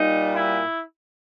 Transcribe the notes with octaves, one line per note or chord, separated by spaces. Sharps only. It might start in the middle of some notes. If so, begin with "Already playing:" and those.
Already playing: A#2 G3 D#4
E4